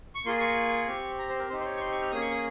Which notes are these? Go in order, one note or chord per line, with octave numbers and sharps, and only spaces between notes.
C#6
A#3 F4 G#4 C6
C#6
C4 G4
A#5
C5
A#4
C4 D#4 G4 C5
C5
C#5
C#6
C6
C#6
F6
A#3 C#4 G#4 D#6
C#6
D#6